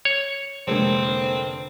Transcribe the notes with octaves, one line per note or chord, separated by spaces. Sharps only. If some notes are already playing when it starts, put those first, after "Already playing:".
C#5
F1 D3 G#3 A#3 C4 A4